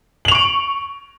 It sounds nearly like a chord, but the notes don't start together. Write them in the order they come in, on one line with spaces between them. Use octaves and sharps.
F#7 F7 C#6 D7